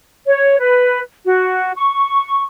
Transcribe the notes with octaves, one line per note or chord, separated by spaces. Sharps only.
C#5
B4
F#4
C#6